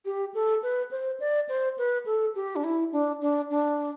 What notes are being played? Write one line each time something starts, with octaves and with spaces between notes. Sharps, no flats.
G4
A4
B4
C5
D5
C5
B4
A4
G4
D4
E4
D4
D4
D4